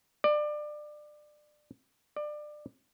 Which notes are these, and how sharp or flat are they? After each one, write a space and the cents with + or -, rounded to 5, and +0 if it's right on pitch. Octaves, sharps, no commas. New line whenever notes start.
D5 +25
D5 +25